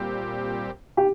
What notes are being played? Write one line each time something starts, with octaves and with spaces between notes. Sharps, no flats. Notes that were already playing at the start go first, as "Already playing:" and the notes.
Already playing: A#2 G3 C4 G4
G4